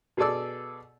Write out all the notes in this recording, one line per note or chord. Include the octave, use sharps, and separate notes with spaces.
B2 G#4 A4 D5 E6